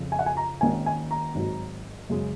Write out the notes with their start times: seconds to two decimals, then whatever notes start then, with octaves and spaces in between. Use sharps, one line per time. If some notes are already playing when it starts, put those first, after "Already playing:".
Already playing: F2 C#3 F3
0.12 G#5
0.19 F#5
0.26 G#5
0.37 A#5
0.61 G#1 G#2 D#3 A#3 C#4 G#5
0.86 G#5
1.11 A#5
1.35 G#1 G#2 F#3
2.10 F#2 C#3 G#3